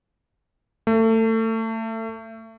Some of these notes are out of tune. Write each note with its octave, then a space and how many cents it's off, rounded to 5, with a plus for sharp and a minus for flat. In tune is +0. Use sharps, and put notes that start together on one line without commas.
A3 +30